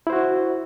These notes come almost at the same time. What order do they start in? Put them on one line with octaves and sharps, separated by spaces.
E4 C5 F#4